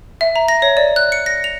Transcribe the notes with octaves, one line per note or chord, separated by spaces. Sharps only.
E5
A#5
A#6
C#5
D5
F#6
C#7
A#6
F7